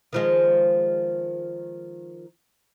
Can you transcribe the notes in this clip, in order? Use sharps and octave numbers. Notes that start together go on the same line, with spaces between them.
D#3 F3 G#3